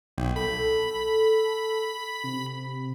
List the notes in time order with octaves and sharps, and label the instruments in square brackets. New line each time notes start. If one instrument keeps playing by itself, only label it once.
[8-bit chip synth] B1 [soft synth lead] G5
[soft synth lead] A4 [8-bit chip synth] B5
[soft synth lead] B6
C3